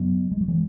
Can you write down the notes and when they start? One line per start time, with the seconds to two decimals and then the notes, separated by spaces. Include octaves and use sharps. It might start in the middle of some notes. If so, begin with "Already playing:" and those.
Already playing: F#2 C#3 F#3 B3
0.31 G#3
0.41 F#3
0.48 E3 G#3